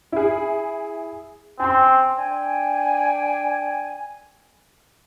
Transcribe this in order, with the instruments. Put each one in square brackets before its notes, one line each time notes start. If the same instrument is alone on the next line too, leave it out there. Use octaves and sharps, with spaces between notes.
[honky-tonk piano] E4 G#4
[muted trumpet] C4 [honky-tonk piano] G#5 C6
[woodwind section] D4 G5 G#5